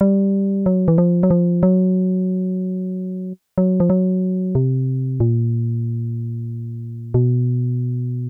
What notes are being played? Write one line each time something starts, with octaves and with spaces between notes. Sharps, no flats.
G3
F#3
E3
F3
F#3
F3
F#3
F#3
F3
F#3
C3
A#2
B2